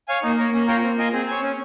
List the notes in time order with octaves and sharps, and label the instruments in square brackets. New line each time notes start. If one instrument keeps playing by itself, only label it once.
[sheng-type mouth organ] C#5 F5 G#5
[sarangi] A#3 [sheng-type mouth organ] D#4
[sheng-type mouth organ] A#4 C#5
[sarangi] A#3 [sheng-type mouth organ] C#4
[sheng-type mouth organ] F4 A#4 C#5 G5
C4
F4 A#4 D#5 G#5
[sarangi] C4 [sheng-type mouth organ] G#4
[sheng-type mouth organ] C#5 G#5
C#4